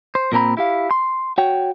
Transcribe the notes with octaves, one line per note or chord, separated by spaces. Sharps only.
C5
A#2 A#3 C4 A#5 B5
E4 G4 F5
C6
F#4 C#5 G5